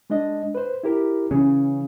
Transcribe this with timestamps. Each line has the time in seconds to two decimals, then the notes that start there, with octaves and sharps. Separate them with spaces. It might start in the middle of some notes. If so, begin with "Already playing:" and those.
0.10 G#3 D4 D#5
0.55 B4 C5
0.83 E4 G4 A#4
1.31 C#3 E3 C#4